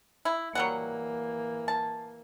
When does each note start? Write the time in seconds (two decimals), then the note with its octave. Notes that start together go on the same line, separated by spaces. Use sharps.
0.25 E4
0.55 E3 F#3 G3 A#3 F#5
1.68 A5